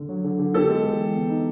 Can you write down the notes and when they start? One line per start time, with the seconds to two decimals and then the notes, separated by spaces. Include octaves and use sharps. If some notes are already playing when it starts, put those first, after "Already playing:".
Already playing: D3
0.09 F#3
0.24 D3
0.39 D3
0.54 B3 G4 A4
0.69 G#3
0.85 E3
1.00 E3
1.15 B3
1.30 D#4